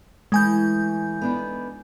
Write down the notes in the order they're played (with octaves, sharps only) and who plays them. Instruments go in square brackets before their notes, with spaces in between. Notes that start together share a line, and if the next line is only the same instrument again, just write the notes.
[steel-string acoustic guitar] E3 A3 [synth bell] G#3 G#5 G6
[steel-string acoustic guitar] B3 D4 D#4